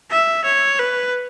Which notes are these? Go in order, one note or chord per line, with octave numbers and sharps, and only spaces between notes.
E5
C#5
B4